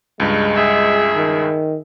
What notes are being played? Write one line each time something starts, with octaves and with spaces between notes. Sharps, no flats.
C#2 G2 G#3
G#4 E5
D#3